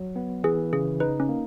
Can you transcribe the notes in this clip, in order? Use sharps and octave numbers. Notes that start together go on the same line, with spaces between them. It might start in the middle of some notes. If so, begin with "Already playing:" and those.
Already playing: F#3
B3
E3 G#4
C#3 G#4
D#4 B4
C#4
A#3